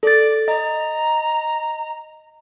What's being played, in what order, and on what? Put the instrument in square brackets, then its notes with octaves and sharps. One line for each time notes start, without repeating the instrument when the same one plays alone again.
[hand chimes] A4 A6 [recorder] D5
[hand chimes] D#5 [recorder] A#5